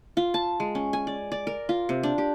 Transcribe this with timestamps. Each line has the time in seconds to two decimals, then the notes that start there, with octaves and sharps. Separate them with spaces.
0.17 F4
0.34 A5
0.60 G#3
0.75 C#4
0.93 G#5
1.07 D5
1.32 D5
1.47 A#4
1.69 F4
1.89 C3
2.03 D4
2.18 G4